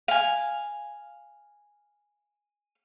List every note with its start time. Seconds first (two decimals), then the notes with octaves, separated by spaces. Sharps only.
0.08 F5 G#5